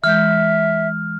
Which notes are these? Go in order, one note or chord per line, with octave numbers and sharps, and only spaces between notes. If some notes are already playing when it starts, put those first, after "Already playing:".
E3 G#3 E5 F6 G6